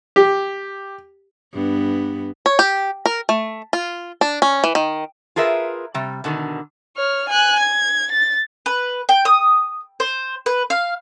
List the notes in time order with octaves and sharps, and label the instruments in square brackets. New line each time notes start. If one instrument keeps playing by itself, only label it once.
[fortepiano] G4
[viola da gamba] G2 B3
[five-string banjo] C#5
G4
A#4
A3
F4
D4
C#4
E3
D#3
[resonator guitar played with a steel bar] F4 G#4 A#4 B4 E5
C3 G3
B2 D3 D#3
[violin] C#5 F6
G#5 F#6
G#6
A6
[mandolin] B4
G5
D#6
C5
B4
F5